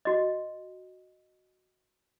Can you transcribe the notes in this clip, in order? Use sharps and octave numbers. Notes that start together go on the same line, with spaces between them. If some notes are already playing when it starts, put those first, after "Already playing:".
F#4 D#5